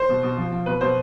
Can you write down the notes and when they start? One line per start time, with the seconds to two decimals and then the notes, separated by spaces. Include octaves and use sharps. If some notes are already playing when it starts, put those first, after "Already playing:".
Already playing: C5
0.09 B2
0.23 B2
0.37 F3
0.51 F3
0.66 B2 B4
0.81 B2 C5